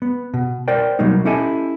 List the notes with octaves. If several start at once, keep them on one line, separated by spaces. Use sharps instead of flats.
B3
B2
A#4 C5 D5 G5
B2 F#3 G3 A#3 D#4
C#4 E4 G4 A4 D#5 G#5